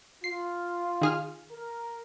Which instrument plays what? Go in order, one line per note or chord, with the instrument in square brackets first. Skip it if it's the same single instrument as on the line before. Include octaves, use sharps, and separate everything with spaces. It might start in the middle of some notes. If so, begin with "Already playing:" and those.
[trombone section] F4 [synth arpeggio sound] C7
[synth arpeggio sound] D#3 G#4 F6
[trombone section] A#4